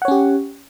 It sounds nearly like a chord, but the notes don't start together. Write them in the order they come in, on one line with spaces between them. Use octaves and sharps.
F#5 C#5 C#4 G4